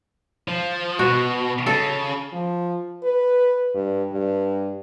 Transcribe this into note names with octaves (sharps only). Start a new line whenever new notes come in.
F3
B2 F#4
C#3 A4
F3
B4
G2
G2